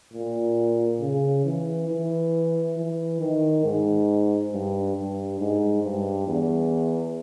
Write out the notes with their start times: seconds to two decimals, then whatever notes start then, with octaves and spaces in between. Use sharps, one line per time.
0.13 A#2
1.01 C#3
1.45 E3
1.89 E3
2.77 E3
3.20 D#3
3.64 G#2
4.52 G2
4.96 G2
5.39 G#2
5.83 G2
6.27 E2